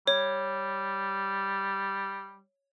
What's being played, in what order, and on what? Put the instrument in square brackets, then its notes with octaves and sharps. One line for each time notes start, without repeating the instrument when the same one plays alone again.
[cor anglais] G3 [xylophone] C#5